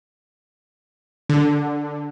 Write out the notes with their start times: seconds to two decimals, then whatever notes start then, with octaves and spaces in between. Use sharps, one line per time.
1.29 D3